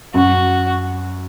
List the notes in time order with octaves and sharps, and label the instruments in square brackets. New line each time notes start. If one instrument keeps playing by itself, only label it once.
[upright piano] F#2 [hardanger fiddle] F#4